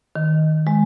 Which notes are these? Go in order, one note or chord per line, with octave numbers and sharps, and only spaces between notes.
D#3
G#3